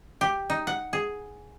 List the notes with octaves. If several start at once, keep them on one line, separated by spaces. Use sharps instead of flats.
G4
D#4
F#5
G#4